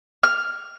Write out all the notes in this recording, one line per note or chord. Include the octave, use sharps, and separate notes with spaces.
F6